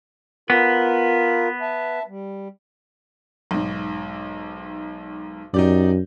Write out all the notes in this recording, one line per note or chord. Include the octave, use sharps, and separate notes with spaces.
B3 F4 A#4
E5 A5
G3
B1 G#2
F#2 D#4 G4 D5